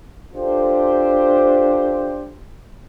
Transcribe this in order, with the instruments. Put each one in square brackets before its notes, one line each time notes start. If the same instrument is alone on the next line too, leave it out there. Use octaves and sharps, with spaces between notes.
[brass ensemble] D4 F4 G4 A4 C5